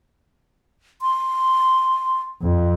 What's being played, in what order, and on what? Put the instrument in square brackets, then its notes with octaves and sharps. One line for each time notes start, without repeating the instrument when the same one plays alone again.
[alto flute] C6
[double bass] F2